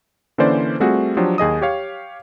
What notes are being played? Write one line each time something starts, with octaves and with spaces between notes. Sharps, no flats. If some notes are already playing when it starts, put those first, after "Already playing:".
D3 E3 A#3 C#4 C5 D5
G3 A3 C4 F4 F#4 G#4
F3 F#3 D4 G4
D#2 G#4 D#5 D#6
G4 C#5 F5